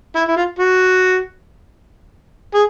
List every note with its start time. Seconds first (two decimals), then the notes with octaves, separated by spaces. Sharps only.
0.15 E4
0.28 E4
0.36 F4
0.59 F#4
2.54 G#4